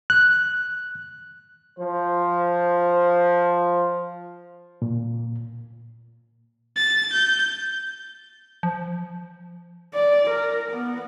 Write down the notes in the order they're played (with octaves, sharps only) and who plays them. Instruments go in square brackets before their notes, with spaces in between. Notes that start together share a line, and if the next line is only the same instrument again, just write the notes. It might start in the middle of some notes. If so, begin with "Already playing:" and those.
[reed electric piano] F#6
[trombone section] F3 C5
[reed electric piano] A#2
[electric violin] A6
G6
[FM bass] F3
[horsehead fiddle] D5
A#4
B3